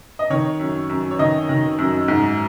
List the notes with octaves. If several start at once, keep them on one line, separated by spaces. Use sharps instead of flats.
D#5
D#3 C#5
F#2
F#2
C#5
D#3 D#5
D#3
F#2
G#2